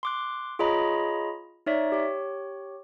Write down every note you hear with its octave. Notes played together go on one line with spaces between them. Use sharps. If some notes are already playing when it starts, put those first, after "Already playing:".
C6 D6 F#6
F4 G#4 C#5 D#5 A#5 B5
D#4 C#5 D5 E5
G4 C#5